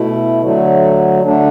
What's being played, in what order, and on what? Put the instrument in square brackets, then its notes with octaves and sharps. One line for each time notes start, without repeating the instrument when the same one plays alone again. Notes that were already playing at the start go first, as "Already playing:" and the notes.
Already playing: [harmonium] B2 A3 E4
D3 F#3 A3
D3 A3 D4